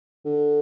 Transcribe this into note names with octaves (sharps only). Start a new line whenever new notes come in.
D3